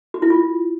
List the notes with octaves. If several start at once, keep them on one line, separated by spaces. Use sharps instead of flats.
F#4
E4
F4